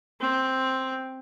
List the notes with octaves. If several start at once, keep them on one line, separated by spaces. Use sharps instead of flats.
C4